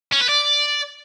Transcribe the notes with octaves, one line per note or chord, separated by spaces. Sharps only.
C#4
B4
D5